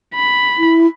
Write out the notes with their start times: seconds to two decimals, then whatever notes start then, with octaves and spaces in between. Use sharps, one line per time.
0.14 B5
0.58 E4